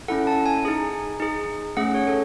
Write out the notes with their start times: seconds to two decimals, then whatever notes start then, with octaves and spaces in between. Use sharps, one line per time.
0.08 C#4 E4 A4 F#5
0.27 A5
0.46 G#5
0.65 D#4 G#4
1.20 D#4 G#4
1.77 A3 C#4 G#4 F#5
1.95 C#5
2.08 A4